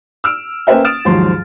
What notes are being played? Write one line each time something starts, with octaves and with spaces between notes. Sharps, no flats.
E6 F6 D7
A#3 C#4 B4 C5 E5 G5
D#6 F6 A6 D7 E7
D#2 G#2 F3 F#3 C6